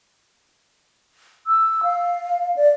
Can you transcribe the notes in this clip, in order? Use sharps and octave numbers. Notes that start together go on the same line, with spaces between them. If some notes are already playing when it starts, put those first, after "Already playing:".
E6
F5
D5